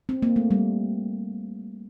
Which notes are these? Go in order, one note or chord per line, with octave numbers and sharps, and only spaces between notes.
C4
A#3
A3
G3